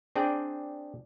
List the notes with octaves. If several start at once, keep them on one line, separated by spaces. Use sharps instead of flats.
C4 D4 G#4 D5 G5